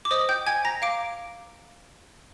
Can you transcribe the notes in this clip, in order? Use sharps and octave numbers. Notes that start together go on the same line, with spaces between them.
D6
C5 D#5 D#6
G5 G6
G5 G#5 G#6
A#5 A#6
F5 D6 D7